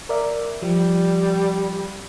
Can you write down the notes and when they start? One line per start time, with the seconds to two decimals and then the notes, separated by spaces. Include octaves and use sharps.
0.09 A#4 D5 E5
0.62 F3 G3